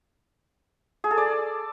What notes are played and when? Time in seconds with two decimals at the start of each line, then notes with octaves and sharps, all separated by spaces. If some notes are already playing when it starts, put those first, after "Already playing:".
1.04 G#4
1.11 A4
1.18 D5